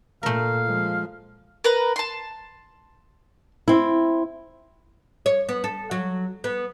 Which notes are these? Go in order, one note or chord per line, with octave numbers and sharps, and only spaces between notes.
A#2 A3 A#4 F5
F3 G#3
A#4 B4 A#5
A5 C6
C4 E4
C#5
B3
A4
F#3
B3